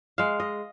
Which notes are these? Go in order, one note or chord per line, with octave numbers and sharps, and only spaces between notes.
G#3 F5
D#5